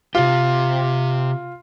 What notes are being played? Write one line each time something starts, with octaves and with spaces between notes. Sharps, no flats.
C3 F4 G4